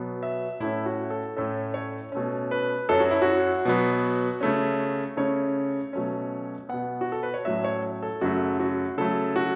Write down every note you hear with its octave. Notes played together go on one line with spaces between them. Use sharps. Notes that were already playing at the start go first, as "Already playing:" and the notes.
Already playing: B2 F#3 B3
E5
A2 A3 C#4 E4
F#4
A4
A2 A3 C#4 A4
C#5
B2 A3 C#4
B4
F#2 F#3 C#4 A4
F#4
E4
F#4
B2 F#3 B3
C#3 A3 C#4
C#3 A3 C#4 C#5
B2 F#3 A3 C#4
B2 B3 F#5
F#4
A4
B4
C#5
A2 F#3 A3 C#4 E5
C#5
A4
F#2 C#3 A3 F#4
F#4
C#3 F#3 A3 A4
F#4